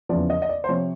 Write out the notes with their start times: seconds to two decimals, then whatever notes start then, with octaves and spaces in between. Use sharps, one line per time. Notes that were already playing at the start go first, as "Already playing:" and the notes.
0.09 E2 C#3 F3 D5
0.30 D#5
0.42 D#5
0.49 D5
0.64 C5
0.69 C3 F3 C#5